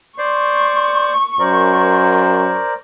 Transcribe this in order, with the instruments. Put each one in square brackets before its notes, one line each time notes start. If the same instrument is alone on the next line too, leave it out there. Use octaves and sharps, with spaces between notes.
[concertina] C5 D5 C6 [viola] C#6
[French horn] F#2 [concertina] A#4 D5 [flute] C5